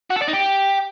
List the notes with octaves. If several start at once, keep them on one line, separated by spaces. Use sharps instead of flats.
F#4
A4
D5
D#4
G4